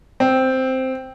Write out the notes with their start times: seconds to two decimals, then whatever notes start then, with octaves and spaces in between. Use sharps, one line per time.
0.20 C4